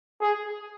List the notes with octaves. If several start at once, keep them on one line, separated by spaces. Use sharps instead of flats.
G#4